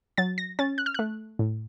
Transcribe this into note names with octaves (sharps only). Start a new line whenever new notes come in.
F#3 A6
A#6
C#4 A6
F#6
F6
A3 F#6
A2